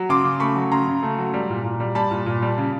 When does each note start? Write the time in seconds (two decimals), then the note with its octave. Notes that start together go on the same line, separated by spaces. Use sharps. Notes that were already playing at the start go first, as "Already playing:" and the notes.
Already playing: F#3
0.09 C#3 C6 D6
0.24 C#3
0.40 A3 B5 C#6
0.56 F#3
0.72 C#3 A#5 C6
0.88 C#3
1.03 A3
1.19 F#3
1.34 G3
1.50 A#2
1.64 A#2
1.80 G3
1.95 G3 A5 B5
2.11 A#2
2.26 A#2
2.42 G3
2.58 C#3